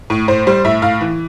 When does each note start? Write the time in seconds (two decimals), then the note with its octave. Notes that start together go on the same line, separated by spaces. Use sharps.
0.10 A2
0.28 A2 C5
0.47 G3 C5
0.65 A2 E5
0.82 A2 F5
1.01 E3